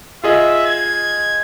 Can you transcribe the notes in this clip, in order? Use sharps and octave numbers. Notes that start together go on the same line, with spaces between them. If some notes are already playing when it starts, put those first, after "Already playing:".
F4 G#4 D#5 E5
G#6